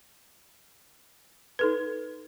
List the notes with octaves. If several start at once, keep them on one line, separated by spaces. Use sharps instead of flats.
D#4 A4 B4